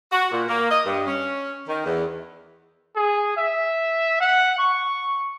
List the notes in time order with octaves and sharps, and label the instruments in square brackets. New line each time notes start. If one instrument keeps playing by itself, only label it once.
[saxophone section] F#4
A#2
A#3
D#5
G2
C#4
D#3
E2
[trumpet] G#4
E5
F#5
C#6